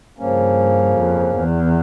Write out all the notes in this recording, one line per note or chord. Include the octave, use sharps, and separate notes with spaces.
G2 C#3 F3 A#3 C#4
F2
E2